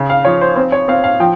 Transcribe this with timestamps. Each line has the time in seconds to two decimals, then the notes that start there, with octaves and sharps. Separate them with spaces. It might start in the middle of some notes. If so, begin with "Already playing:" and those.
Already playing: C#3
0.10 F5
0.25 F3 C#5
0.41 C5
0.56 C4 C5
0.72 C#5
0.88 C4 F5
1.04 F5
1.20 F3 G5